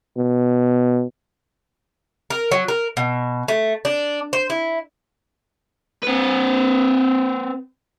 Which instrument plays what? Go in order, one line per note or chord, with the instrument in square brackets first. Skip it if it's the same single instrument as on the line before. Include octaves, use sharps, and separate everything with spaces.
[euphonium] B2
[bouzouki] A#4
F#3
A#4
B2
A3
D4
C5
E4
[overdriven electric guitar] C4 B4